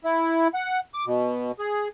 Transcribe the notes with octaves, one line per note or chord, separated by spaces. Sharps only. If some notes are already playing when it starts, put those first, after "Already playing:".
E4
F#5
D6
B2
G#4